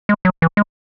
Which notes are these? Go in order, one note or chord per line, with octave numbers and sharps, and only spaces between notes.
G#3
F#3
E3
G#3